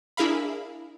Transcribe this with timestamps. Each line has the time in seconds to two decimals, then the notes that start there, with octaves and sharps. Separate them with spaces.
0.17 D4 E4 G#4 A#4 F5 B5